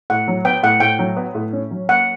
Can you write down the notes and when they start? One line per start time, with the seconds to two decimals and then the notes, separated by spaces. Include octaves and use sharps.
0.10 A2 F#5
0.28 F#3
0.45 B3 G5
0.63 A2 F#5
0.80 A2 G5
0.99 F#3
1.17 B3
1.35 A2
1.53 C#4
1.71 F#3
1.89 A#3 F#5